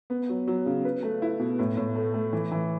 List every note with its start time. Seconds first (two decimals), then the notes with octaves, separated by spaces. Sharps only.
0.10 B3
0.29 F#3
0.47 F#3
0.66 C#3
0.85 B4
1.03 A3
1.22 E4
1.40 B2
1.59 A2
1.77 A2
1.95 A3
2.14 A3
2.33 E3
2.52 E3